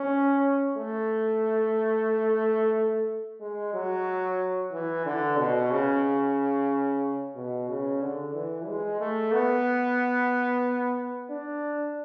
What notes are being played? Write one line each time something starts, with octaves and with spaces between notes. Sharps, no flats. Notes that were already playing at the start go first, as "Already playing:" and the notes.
Already playing: C#4
A3
G#3
F#3
E3
D3
B2
C#3
B2
C#3
D3
E3
G#3
A3
B3
D4